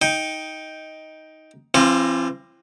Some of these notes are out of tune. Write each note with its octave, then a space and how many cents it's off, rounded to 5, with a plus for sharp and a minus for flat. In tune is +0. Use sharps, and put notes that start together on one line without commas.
D#4 +10 G5 +0
E3 +45 C4 +25 F4 +0